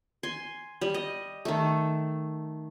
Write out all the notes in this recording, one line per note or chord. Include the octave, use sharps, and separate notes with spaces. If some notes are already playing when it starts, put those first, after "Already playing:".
G#5 C6
G3
D#5
D#3 A3